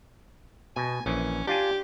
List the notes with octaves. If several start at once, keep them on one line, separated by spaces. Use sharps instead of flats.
B2 G#5
A#1 E3 C#4
D4 F4 G4 G#5